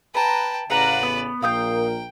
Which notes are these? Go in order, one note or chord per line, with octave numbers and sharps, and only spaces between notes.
B4 G5 A5 A#5
A1 C#3 B4 D5 F5 F#5 A#5
B3
A#1 A#2 A#4 F5 G5 D#6 G6